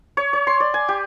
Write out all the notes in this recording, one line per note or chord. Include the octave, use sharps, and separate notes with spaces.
C#5
C#5
C6
D5
G#5
G4